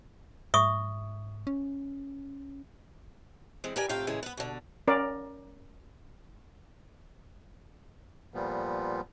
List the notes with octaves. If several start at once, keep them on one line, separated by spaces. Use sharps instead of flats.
G#2 E5 C#6 D#6
C#4
E3 G#3 C4
G4 A#4 B4 D5 G#5
A2 C3 F4 F5 G5
A2 C#3 E3 G#3
B3 B4
B2 D3
C#4 A#4 D5
A#2 F3 G3 B3